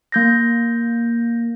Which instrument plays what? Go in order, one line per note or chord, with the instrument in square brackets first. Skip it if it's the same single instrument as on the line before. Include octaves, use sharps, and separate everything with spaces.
[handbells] A#3 G6 A#6